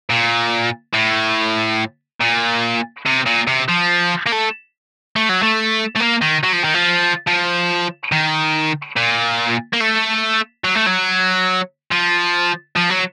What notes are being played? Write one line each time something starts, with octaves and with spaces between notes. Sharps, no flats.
A#2
A2
A#2
C3
A#2
C3
F3
A#3
A3
A3
F#3
A3
A3
A#3
D#3
F#3
F3
D#3
F3
F3
D#3
A#2
A#3
A3
F#3
A3
F#3
F3
F3
F#3